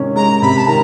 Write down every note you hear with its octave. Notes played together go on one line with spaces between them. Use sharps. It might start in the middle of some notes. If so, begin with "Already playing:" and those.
Already playing: C3 D#3 G#3 C#4
G#3 A#5
C3 B5
A5
D#3 A#5